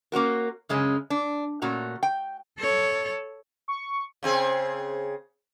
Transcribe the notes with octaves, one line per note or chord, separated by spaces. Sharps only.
A#3 C#4 F#4 A#4
F#2 C#3 G#3 C#4
D4
A#2 A3 C#4 F#4 A#5
G5
A4 C#5
C#6
C#3 C4 G#4